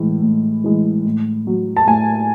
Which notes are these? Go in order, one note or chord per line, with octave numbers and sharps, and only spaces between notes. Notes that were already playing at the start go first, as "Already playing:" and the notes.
Already playing: A2 E3 G#3
A2
E3 G#3
A2
F#3
A5
A2 G#5